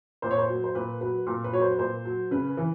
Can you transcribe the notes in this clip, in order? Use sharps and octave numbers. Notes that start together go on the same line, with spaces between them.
A#2 C5
C#5
C5
F#3
C5
A#2 B4
F#3 B4
A#2 A#4
B4
F#3 C#5
C5
B4
A#2 C5
F#3
C#3 B4
E3